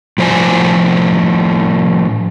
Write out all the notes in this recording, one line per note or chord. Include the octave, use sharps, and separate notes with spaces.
A2 F3 C5 D5 G#5